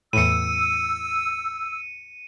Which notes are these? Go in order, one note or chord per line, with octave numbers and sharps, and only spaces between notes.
E2 A2 E6 C#7 D#7